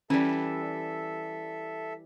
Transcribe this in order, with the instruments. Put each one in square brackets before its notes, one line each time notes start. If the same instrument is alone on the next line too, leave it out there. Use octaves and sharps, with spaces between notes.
[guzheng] E3 G3 [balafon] C#4 [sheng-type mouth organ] A4 E5